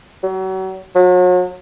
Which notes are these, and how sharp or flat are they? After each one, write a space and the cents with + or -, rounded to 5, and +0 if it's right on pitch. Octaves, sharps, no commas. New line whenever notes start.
F#3 +35
F#3 -40